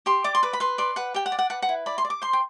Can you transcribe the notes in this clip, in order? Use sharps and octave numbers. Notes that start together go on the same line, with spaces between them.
G4 C6
D5 D6
C6
B4 D6
B5
B4 C6
D5 C6
B4 F#5
G4 G5
F#5
D5
F#5
B4 F#5
F#5
E4
D5 B5
C6
D5
D6
C5 C6
G5